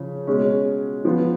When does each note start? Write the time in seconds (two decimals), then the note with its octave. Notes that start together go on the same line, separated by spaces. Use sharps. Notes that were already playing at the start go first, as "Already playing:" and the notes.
Already playing: C#3 F3
0.27 B2 G#3 C#4
1.05 F3 B3 F4